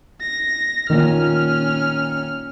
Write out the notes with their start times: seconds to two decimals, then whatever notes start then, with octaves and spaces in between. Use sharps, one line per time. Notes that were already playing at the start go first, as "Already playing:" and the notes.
0.21 A#6
0.90 A#2 D#3 C#4 F6